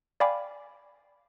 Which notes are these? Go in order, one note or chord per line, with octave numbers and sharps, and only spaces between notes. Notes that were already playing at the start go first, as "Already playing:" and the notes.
D5 F5 G5 G#5 B5 D6